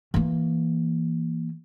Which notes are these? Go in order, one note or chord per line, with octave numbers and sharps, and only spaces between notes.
E3 A#3